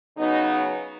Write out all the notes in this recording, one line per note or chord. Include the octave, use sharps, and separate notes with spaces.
C#3 F#3 B3 D#4